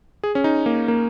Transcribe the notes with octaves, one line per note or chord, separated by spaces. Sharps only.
G#4
C#4
D#4
A#3
A#3